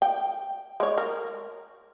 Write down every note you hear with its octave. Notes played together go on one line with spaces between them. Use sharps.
G5
G#3 C#5
A#4